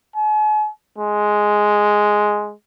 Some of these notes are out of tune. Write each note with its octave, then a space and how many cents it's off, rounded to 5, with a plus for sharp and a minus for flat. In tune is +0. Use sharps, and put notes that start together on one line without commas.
G#5 +45
G#3 +5